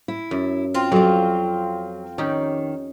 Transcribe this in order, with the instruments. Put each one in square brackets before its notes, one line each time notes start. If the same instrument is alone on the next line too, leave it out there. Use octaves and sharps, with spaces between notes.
[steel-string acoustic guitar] E4
[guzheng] F#2
[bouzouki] C4 F4
[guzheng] F2 D5 [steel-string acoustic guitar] F#3
[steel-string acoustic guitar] D#3 [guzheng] C#4 D#4 G4